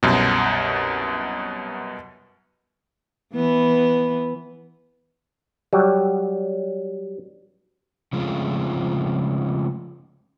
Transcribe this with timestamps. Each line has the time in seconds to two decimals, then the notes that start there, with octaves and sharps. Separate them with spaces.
0.03 C2 F#2 B2
3.34 E3 B3
5.73 F#3 G3
8.13 C#3 F3 G#3 A3 C4 F4